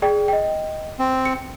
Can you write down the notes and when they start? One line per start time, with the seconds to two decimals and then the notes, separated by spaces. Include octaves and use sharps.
0.02 G#4 D5 G5
0.28 D#5 G5
0.99 C4
1.26 C#7